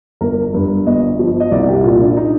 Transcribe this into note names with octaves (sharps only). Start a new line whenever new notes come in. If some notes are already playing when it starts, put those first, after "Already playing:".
G1 A#4
G2
G1 D#5
F3
D#5
C2 D5
G4
A#2 F4
D4
D#4